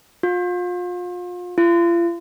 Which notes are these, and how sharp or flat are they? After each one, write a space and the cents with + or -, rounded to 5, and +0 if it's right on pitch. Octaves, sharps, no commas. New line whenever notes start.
F4 +35
F4 -40